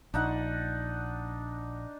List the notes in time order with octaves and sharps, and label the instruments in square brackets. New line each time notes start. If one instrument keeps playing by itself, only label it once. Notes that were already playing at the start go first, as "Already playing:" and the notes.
[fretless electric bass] A#1 [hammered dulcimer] D4 D#4 F#5